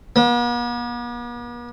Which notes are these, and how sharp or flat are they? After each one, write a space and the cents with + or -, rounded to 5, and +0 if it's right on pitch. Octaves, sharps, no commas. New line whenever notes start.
B3 -45